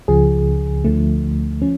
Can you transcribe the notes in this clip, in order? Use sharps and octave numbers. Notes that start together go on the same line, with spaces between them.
C#2 C#3 F3 G#4
D2 D3 F3 A3
F3 C#4